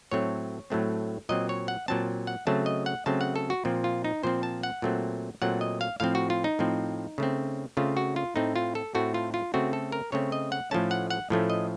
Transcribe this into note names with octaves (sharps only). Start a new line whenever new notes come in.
A2 F#3 A3 C4 C#5
A2 F#3 A3 C4
A#2 F#3 C4 D#5
C#5
F#5
A#2 F#3 C4 A5
F#5
C#3 F#3 A3 C4 A5
D#5
F#5
C#3 F#3 A3 C4 A5
F#5
A4
F#4
A#2 F3 C4
F4
D#4
A#2 F3 C4 C5
A5
F#5
A#2 F#3 A3 C4
A#2 F#3 A3 C4 F#5
D#5
F5
A2 F3 C4 F5
F#4
F4
D#4
A2 F3 C4
C#3 A3 C4
C#3 A3 C4 F4
F#4
F4
A2 A3 C4 D#4
F4
A4
A2 A3 C4 F#4
F4
F4
C#3 A3 C4 F#4
A4
A#4
C#3 A3 C4 C#5
D#5
F#5
A2 F3 A3 C#4 A5
F#5
F#5
A2 F3 A3 C#4
D#5